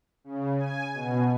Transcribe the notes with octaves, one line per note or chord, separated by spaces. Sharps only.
C#3
G#5
B2